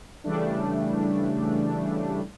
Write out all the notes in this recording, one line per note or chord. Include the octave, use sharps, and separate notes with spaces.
C#3 E3 G3 A3 D4